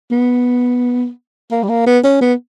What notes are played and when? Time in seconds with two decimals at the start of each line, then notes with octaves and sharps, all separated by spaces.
0.11 B3
1.51 A#3
1.63 G3
1.69 A#3
1.86 B3
2.04 C#4
2.21 B3